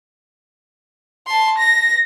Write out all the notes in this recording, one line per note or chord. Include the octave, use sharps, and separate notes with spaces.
A5 C6
A#6